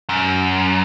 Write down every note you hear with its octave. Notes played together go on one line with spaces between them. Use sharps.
F#2